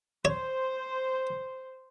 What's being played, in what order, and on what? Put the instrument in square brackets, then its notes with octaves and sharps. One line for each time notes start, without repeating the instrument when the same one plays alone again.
[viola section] C5 [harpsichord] C#5